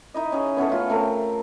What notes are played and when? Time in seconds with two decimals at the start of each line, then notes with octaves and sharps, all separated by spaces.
0.14 D#4 E4 D#5
0.32 C#4 G#4
0.56 B3 C#4 E4 A4
0.69 A3 F4
0.89 A3 C4 A#4